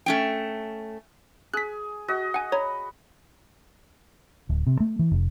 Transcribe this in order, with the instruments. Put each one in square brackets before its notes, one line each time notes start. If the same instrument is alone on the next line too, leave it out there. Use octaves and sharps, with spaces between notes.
[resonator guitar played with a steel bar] A3 C#4 G5
[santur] G#4 [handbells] F#6 B6
[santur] F#4 D#5
[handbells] F#5 G#5
[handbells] C#5 A#5 [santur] B5
[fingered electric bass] D1
C3
A3
E3
F1